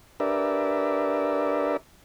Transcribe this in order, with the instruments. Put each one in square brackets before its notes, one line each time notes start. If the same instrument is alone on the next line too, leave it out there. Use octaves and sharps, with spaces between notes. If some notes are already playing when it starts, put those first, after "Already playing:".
[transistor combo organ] D4 G4 A#4 B4 D5 E5